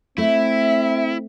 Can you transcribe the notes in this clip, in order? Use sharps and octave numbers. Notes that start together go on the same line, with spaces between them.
A3 C4 E4 E5